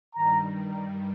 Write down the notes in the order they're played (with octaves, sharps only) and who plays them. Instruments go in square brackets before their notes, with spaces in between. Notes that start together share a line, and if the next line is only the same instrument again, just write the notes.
[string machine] G2 D#3 G3 [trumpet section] A#5